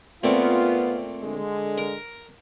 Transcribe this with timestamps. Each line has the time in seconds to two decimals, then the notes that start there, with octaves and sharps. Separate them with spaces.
0.23 A#2 A3 B3 C4 F4
1.23 D3 G#3
1.78 A#4